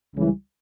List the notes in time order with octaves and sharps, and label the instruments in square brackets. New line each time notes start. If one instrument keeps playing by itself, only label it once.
[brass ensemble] C#2 C#3 E3 G3